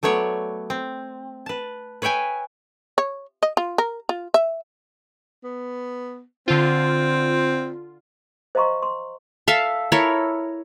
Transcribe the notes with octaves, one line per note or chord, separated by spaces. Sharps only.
F#3 A3 B3 C#5 D5
C4
B4 A5
B4 C#5 E5 G5 G#5
C#5
D#5
F4
A#4
F4
E5
B3
D3 C4 F4
C5 D#5 F5 A#5 C6 C#6
C6
A4 E5 F5 A5
E4 A4 A#4 C#5